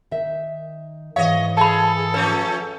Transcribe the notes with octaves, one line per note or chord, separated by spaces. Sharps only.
D#3 E5
G#2 E3 C#5 D#5 F5
G#4 A4 A5 B5
F3 A3 C#4 B4